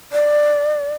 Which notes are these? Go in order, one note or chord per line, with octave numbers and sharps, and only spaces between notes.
D5